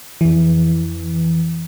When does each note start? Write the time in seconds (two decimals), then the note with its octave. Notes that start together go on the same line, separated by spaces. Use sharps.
0.21 F2 E3